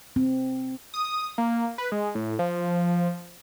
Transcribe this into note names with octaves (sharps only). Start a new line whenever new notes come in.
C4
D#6
A#3
B4
G#3
A2
F3